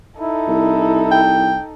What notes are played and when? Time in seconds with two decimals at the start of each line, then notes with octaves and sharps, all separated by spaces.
0.20 D#4 E4 A4
0.48 C2
1.11 G5